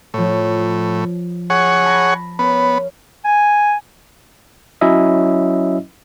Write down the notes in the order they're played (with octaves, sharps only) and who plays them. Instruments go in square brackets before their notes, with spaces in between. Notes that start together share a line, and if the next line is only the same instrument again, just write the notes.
[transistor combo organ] A2 [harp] F3 C#5
[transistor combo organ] G#4 C#5 F#5
[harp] A5 B5 A#6
[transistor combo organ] B3 [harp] C#4 A#4
[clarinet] G#5
[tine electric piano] F#3 C#4 E4 D#5 E5